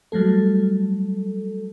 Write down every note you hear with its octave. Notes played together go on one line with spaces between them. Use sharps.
F#3 G3 A3 A4